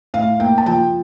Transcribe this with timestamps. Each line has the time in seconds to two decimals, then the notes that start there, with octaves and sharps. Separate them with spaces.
0.14 A2 F5
0.40 A#3 G5
0.58 A5
0.66 F3 G5